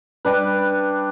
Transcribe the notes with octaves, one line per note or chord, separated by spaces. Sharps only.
G3 D4 B4